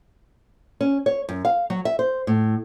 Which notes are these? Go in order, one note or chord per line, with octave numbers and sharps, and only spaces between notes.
C#4
C#5
F#2
F5
F#3
E5
C5
A2